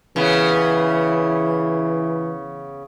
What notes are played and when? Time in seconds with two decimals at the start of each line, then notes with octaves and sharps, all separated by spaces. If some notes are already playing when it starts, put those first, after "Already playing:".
0.16 C#3 E3 B3